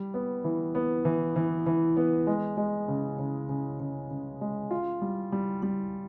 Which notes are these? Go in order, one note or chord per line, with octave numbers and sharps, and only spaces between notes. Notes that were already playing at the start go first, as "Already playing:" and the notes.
Already playing: G3
B3
E3
B3
E3
E3
E3
B3
G#3
G#3
C#3
C#3
C#3
C#3
C#3
G#3
F4
G3
G3
G3